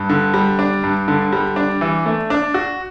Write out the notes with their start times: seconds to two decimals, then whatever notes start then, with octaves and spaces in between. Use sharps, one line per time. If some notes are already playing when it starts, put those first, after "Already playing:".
Already playing: G2
0.09 D3
0.34 G3
0.59 D4
0.84 G2
1.08 D3
1.33 G3
1.56 D4
1.81 E3
2.06 A3
2.30 D4
2.54 F#4